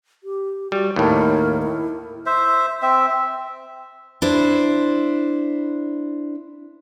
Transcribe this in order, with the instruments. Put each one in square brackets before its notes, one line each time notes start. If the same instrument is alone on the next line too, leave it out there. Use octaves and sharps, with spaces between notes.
[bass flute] G4
[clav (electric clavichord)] G3 [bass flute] F#4
[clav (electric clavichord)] D#2 A2 [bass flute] A#4
[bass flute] E4
[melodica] C5 E5
C4 E5
[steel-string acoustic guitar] D4 E4 C5